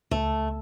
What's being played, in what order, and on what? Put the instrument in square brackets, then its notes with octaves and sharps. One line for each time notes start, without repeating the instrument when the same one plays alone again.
[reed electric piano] C#2 [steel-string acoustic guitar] A3